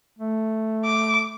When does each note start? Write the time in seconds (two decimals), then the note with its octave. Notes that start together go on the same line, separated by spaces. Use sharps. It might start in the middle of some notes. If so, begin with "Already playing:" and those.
0.19 A3
0.85 D6